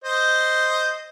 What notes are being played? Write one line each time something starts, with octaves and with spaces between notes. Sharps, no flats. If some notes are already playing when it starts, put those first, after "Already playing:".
C5 D#5